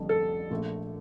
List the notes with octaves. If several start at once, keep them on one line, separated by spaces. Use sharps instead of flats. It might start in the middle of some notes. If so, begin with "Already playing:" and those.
Already playing: F1 F2 D3 G3
A4
A#1 A#2 A3